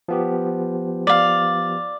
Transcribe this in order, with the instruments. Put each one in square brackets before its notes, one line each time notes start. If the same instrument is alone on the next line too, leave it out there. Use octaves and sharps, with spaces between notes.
[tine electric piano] F3 B3 G4
[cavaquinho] D5 F5